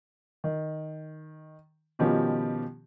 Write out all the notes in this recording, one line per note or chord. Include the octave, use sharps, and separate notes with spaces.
D#3
B2 D#3 F3 G3 C#4 G4